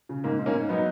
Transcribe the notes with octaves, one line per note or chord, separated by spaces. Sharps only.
C#3
G#2 A#3
G#2
A#3 C#4
G#2
F#3 B3 D#4